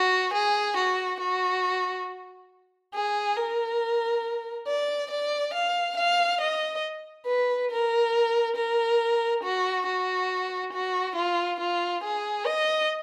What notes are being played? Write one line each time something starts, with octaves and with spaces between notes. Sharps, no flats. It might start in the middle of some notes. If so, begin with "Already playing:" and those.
Already playing: F#4
G#4
F#4
F#4
G#4
A#4
D5
D5
F5
F5
D#5
B4
A#4
A#4
F#4
F#4
F#4
F4
F4
G#4
D#5